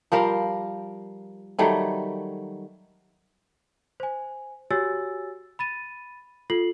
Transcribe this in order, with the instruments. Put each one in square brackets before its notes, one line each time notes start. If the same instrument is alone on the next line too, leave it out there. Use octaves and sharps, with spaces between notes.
[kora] F3 G3 A#4 F5
D#3 F#3 G3 A3
[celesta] C5 G#5
F#4 G4 C#5 G#5 E6 A6
B5 A6 D#7
F4 A4 C7 F#7